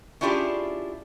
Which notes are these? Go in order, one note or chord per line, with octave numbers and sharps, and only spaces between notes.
C#4 D4 E4 F4 G4 G#4